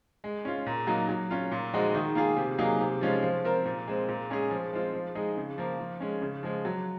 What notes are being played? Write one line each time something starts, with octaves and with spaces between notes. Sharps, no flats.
G#3
C#4 F4
A#2
F#3 A#3 D#4
F#3
C#4 F4
A#2
F3 G#3 D#4 F#4
D#3
A#3 F4 G#4
C3
F#3 A#3 D#4 G#4
C3
F3 G#3 C#4 F4
F3
C4 F4 A#4
A#2
G#3 C4
A#2
G#3 C#4 G#4
F3
G#3 C4 F4
F3
G#3 D#4 G#4
C#3
F3 A#3
F3
G#3 C#4
C#3
F3 G#3
F#3